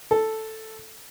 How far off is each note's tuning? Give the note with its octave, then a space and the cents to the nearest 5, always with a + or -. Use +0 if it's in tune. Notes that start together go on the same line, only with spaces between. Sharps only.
A4 +0